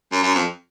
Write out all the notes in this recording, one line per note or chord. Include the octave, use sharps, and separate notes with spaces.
F#2
F#2
F2